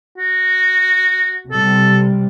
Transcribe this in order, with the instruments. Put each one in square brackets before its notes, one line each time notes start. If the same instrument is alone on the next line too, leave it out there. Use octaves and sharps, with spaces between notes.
[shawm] F#4
[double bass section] C3 G3 [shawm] A4